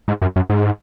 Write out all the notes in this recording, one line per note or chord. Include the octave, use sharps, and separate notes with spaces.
G#2
F#2
F#2
G#2